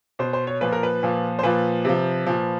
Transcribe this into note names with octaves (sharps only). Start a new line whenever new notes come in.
B2 C5
C5
C#5
A#2 F3 B4
A#4
B4
A#2 F3
C5
A#2 F3 B4
C3 F3
A#2 F3